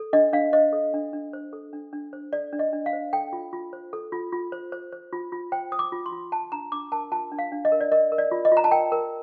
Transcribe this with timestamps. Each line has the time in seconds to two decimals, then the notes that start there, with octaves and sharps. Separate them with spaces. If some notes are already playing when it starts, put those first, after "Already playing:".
Already playing: A4
0.13 D4 D#5
0.33 D4 F5
0.53 C5 D#5
0.73 A4
0.94 D4
1.13 D4
1.33 C5
1.53 A4
1.73 D4
1.93 D4
2.13 C5
2.33 A4 D5
2.53 D4
2.59 D#5
2.73 D4
2.86 F5
2.93 C5
3.13 A4 G5
3.33 F4
3.53 F4
3.73 C5
3.93 A4
4.12 F4
4.32 F4
4.52 C5
4.72 C5
4.92 C5
5.13 F4
5.32 F4
5.52 C5 G5
5.72 C5 D#6
5.79 D6
5.92 F4
6.06 C6
6.12 F4
6.32 F4 A5
6.52 D4 A#5
6.72 D4 D6
6.92 A#4 A5
7.12 F4 A5
7.32 D4
7.39 F5
7.52 D4
7.65 D#5
7.72 A#4
7.81 D5
7.92 A#4 D#5
8.12 A#4
8.18 D5
8.31 F4
8.45 D#5
8.52 F4
8.57 A#5
8.64 A5
8.72 A#4 G5
8.92 A#4